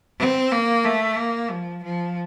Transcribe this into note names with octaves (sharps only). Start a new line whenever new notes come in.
C4
A#3
A3
A#3
F3
F3